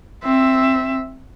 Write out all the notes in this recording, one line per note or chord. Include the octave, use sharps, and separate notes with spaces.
C4 E5